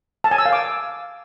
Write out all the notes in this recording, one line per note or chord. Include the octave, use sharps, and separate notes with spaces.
A5
G#5
E6
F5
D6